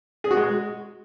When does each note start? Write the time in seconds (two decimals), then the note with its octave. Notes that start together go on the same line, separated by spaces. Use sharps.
0.24 G#4
0.31 F#4
0.37 G#3